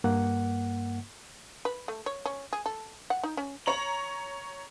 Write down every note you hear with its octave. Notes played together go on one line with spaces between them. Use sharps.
G2 A#3 F#5
B4
A3
C#5
C#4
G#4
A4
F#5
D#4
C#4
C#5 A#5 F#7